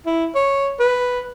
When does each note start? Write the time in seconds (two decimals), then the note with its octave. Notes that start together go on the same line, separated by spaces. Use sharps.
0.06 E4
0.35 C#5
0.80 B4